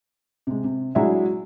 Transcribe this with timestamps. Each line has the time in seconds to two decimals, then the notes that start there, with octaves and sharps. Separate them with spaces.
0.47 C3 G#3
0.64 C3
0.95 F#3 G#3 D4 E4 G#4 E5